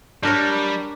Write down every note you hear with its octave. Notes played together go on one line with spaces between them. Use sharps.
G3 D4 A#4 C#5